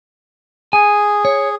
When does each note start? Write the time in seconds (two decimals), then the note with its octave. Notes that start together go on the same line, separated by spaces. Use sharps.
0.73 G#4 G#5
1.25 C#5